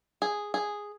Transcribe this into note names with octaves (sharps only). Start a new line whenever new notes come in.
G#4
G#4